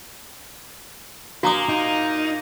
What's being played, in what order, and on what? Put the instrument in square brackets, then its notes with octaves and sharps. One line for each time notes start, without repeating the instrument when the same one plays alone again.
[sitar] A#2 A#3 [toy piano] F#4 A#5 D#6
[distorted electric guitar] D#4